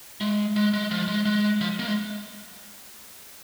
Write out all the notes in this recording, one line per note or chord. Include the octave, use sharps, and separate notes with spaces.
G#3
G#3
G#3
F3
G#3
G#3
F3
A#3
G#3